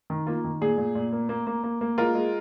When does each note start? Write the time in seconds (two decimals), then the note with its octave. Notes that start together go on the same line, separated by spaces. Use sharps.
0.10 D#3
0.27 A#3 F4
0.44 D#3
0.61 A#2 G#4
0.78 A#2
0.95 A#2
1.13 A#3
1.29 A#3
1.47 A#3
1.64 A#3
1.81 A#3
1.98 G#3 F4 A#4
2.15 G#3